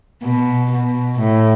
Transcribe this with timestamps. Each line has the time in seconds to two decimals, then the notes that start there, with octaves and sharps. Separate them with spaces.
0.23 B2
0.71 B2
1.19 A2